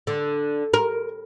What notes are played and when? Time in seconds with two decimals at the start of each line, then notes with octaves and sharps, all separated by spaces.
0.07 D3
0.74 A#4